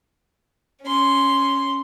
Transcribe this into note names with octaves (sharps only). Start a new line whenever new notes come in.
C#4 C6